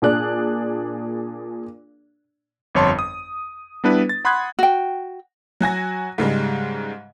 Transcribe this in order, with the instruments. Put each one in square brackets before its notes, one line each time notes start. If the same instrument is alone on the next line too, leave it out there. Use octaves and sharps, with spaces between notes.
[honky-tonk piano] A#2 D4 G#4 D5 F#6
[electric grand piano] G1 F2 C#5 A5 C6
D#6
G3 B3 D4 E4 B4
A6
F#5 B5 C6 D#6 F#6 G#6
[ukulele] F#4 G5
[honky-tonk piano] F#3 F#4 G#5 A#6
G#2 C#3 G3 G#3